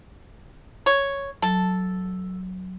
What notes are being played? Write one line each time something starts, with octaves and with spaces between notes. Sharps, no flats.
C#5
F#3 A4